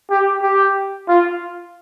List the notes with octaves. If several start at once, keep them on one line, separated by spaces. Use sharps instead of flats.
G4
G4
F4